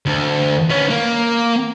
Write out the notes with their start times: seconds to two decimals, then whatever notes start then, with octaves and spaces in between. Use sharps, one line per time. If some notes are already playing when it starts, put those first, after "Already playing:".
0.06 D2
0.70 B3 C#4
0.90 A#3